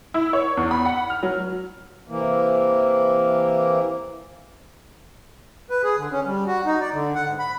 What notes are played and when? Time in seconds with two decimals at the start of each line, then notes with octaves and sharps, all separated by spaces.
0.14 E4
0.33 C#5
0.57 E2
0.71 B5
0.86 F#5
1.10 F6
1.23 F#3
2.08 C3 E3 A#3
5.70 B4
5.84 G#4
5.97 D3
6.11 C#4
6.25 G3
6.47 F#4
6.65 D#4
6.80 D5
6.93 D3
7.15 F#5
7.27 G#2
7.39 B5